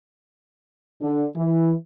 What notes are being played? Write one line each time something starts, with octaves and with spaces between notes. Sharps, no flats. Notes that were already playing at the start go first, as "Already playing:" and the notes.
D3
E3